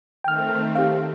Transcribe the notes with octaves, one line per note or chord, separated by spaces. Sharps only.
D#3 A3 C4 G5 F6
G4 F5